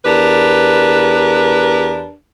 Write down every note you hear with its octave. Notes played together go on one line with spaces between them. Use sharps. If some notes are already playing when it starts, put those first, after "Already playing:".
E2 D4 G4 A#4 B4